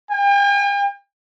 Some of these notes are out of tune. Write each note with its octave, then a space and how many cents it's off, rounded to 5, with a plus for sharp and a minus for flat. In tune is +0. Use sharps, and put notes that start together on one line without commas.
G5 +45